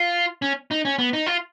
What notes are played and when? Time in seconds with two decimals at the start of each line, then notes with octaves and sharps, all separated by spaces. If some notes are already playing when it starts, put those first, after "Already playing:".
Already playing: F4
0.42 C#4
0.71 D#4
0.85 C#4
0.99 B3
1.13 D#4
1.26 F4